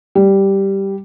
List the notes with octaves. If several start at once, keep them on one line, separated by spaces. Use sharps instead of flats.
G3